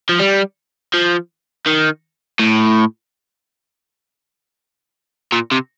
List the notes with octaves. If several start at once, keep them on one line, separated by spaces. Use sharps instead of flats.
F3
G3
F3
D#3
A2
A#2
C3